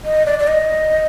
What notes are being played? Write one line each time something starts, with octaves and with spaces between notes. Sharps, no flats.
D#5
D5
D5
D#5